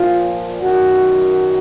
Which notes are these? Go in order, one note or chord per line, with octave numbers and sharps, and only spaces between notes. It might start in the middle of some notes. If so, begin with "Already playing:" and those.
Already playing: A#2 F3 F4
F#2 D#3 F#4